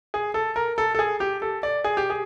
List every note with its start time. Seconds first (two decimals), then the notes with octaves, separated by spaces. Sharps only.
0.14 G#4
0.34 A4
0.56 A#4
0.78 A4
0.95 A4
0.99 G#4
1.20 G4
1.42 A4
1.63 D5
1.84 G#4
1.97 G4
2.10 G#4